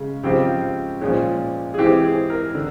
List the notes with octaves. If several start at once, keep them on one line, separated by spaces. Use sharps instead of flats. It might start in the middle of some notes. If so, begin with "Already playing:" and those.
Already playing: C#3 G#3
C#3 F3 G#3 C4 G4
A#2 F3 G#3 C#4
G#4
E3 G#3 C4 G4
G#4
A#4
D3